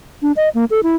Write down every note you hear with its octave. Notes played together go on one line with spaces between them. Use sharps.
D4
D#5
A#3
A4
E4